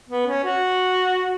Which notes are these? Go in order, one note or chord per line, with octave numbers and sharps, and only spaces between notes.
B3
C#4
F#4